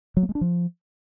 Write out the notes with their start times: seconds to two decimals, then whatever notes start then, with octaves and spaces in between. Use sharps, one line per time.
0.17 F#3
0.23 A#3
0.29 G#3
0.35 D4
0.41 F3